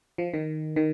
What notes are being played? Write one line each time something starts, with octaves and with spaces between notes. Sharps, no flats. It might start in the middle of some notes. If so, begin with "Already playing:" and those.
F3
D#3
D#3